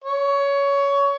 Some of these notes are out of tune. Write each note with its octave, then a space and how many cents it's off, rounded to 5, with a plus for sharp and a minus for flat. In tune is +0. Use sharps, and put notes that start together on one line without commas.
C#5 +20